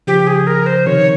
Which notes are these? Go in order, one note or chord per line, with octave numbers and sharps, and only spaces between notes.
C#3 F3 G4
G#4
A#4
C5
C3 D#3 C#5